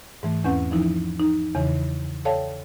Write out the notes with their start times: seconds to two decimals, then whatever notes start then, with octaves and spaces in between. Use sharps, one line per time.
0.23 G#2 E3 A3
0.44 E2 C4 C#4 B4 F#5 G6
0.71 E3 F3 D#4 E4
1.20 D#4
1.55 E2 C#3 E3
2.25 A4 C#5 D5 F5 G5 A5